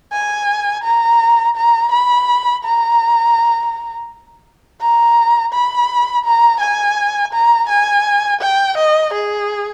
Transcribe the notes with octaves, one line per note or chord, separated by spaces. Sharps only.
G#5
A#5
A#5
B5
A#5
A#5
B5
A#5
G#5
A#5
G#5
G5
D#5
G#4